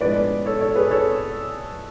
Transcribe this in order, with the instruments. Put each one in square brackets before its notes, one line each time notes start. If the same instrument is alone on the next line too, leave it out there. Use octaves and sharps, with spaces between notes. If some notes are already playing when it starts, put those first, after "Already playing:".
[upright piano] A2 F3 G#3 B3 D4 B4 D5
A4 C#5
A4 C#5
G#4 B4
A4 C#5